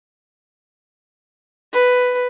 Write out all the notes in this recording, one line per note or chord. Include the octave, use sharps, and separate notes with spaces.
B4